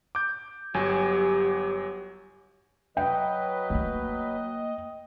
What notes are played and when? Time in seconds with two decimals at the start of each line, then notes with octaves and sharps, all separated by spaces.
0.15 D6 G6
0.74 G1 F#3 G4 G#5
2.97 F#3 B4 D#5 G5
3.70 A3 A#3